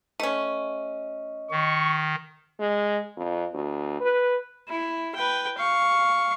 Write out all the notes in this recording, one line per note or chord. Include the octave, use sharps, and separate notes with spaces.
A3 C#4 D#5
D#3 C#6
G#3
F2
D2
B4
E4
B4 G5
F5 C#6